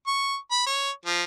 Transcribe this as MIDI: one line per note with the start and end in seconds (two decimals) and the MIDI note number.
0.07 0.36 85
0.51 0.63 83
0.66 0.90 73
1.06 1.23 53